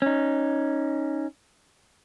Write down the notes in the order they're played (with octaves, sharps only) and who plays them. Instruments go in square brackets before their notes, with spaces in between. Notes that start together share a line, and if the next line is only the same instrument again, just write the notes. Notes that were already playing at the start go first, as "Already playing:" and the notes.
[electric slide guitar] C#4 D#4